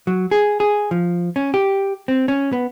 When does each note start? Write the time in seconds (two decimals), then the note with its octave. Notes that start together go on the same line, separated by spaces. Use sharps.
0.07 F#3
0.31 G#4
0.60 G#4
0.91 F3
1.36 C#4
1.54 G4
2.08 C4
2.28 C#4
2.53 B3